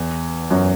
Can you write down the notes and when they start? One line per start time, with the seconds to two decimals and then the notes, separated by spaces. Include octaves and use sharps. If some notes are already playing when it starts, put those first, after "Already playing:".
Already playing: E2
0.51 F#2